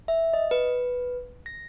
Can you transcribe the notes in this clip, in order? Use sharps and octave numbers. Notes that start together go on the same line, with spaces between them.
E5
D#5
B4
A#6